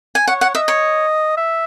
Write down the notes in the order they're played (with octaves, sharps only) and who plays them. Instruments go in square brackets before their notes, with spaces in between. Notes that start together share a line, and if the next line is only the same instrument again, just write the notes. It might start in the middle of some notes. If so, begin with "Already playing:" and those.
[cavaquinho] G#5
[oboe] C#5 [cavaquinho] F#5
[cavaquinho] F#5
[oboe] D#5 [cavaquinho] E5
[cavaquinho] C#5
[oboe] E5